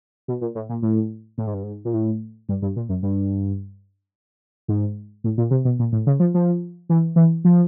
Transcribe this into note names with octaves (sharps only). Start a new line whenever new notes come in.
B2
A#2
A2
A#2
A2
A2
G#2
G2
G#2
A#2
A2
G2
G2
A#2
F#2
G2
G#2
A2
A#2
C3
B2
A#2
A2
C#3
F3
F3
E3
E3
F3